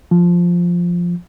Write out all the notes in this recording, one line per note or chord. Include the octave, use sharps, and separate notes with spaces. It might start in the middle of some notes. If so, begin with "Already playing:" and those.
F3